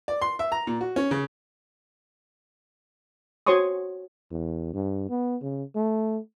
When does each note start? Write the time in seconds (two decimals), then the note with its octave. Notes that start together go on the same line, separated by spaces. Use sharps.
0.08 D5
0.22 C6
0.39 E5
0.52 A#5
0.67 A#2
0.81 F#4
0.96 C#4
1.11 C#3
3.47 F#4 C5 C#5 C6 C#6 D#6
4.31 E2
4.74 G2
5.09 B3
5.42 C#3
5.75 A3